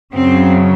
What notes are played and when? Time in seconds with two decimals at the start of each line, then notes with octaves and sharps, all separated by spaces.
0.13 F#2 C#3 F#3 C4